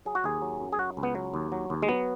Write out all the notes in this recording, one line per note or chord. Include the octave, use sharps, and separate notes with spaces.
F#3 G#4
F#4
D#2 G#4
F#3
F#2
G#4
F#3 F#4
C#2
B3
F#3
D#2
F#3
D#2
G#3
F#3 B3